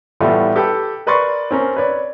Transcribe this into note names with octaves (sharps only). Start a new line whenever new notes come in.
A2 E3 G3 A3 B3 F4
G4 A4 B4 G5
A#4 B4 D5 C6 C#6 A6
C4 C#4 A#4
B4 C#5 D5